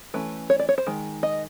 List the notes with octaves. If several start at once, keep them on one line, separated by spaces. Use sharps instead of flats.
E3 A3 C#4 B4
C#5
D5
C#5
C5
D#3 G#3
D#5